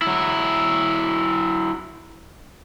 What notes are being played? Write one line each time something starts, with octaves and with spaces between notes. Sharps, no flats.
F#3 E4